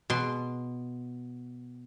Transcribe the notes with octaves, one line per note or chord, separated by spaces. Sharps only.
B2 C6